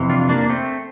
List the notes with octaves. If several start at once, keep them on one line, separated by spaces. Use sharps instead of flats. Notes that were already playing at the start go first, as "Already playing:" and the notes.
Already playing: F2 C3 E3
D4 F4
A#3 D4
A3 C4